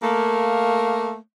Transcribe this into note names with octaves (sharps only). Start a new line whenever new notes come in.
A3 A#3